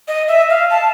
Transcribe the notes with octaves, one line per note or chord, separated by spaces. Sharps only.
D#5
E5
F5
A5